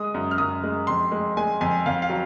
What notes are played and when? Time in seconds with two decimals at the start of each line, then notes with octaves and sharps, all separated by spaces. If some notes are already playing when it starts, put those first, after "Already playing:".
Already playing: G#3 D#6
0.14 F#2
0.31 F6
0.38 F#2 D#6
0.63 G#3
0.87 F2 C6
1.12 G#3
1.37 G#3 G#5
1.61 F2 G#5
1.86 F2 F5
2.02 F5
2.10 F#3